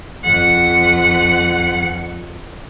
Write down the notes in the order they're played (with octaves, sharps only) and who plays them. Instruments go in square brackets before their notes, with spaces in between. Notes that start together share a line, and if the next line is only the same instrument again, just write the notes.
[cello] F2 F#5